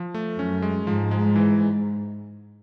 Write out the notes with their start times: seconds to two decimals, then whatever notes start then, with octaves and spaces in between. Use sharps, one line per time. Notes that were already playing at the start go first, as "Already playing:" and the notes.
Already playing: F3
0.14 A3
0.39 F#2 C#4
0.62 G#3
0.87 G#2 F3
1.11 G#3
1.36 E3